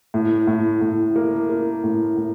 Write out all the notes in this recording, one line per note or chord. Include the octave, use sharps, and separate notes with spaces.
A2
A2
A2
A#3
A#3
A2
A2